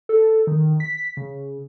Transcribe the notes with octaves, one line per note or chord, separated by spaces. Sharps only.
A4
D#3
B6
C#3